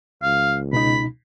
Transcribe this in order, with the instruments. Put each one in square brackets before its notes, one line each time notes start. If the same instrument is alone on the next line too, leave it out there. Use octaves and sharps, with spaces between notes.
[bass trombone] C#2 [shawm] F5
[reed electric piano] B2 D#4 [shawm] B5